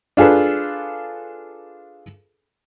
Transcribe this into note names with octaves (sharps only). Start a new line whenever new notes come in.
D4 F4 G#4 A4 B4